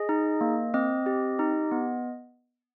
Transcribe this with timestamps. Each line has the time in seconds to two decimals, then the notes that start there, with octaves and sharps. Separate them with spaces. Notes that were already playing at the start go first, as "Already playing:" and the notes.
Already playing: G#4 D#5
0.09 D#4
0.41 A#3
0.74 C4 D#5
1.06 G4
1.39 D#4
1.72 B3